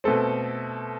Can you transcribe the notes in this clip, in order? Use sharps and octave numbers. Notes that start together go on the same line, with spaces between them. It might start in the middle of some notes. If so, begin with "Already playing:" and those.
B2 A3 C4 A4